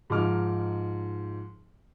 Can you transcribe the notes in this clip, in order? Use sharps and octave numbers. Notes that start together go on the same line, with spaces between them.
G#2 F3 D#4 D6 F6